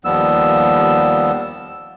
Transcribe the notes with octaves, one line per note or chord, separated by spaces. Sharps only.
D#2 F3 G3 B3 E6